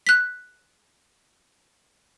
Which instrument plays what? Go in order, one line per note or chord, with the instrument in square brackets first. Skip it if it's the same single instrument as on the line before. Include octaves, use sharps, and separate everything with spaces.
[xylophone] F#6 B6